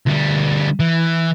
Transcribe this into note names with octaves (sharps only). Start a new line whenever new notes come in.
D2 G3
E3